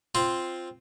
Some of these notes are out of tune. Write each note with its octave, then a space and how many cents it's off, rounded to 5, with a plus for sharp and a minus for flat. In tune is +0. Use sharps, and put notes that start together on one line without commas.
C4 +0 F4 +0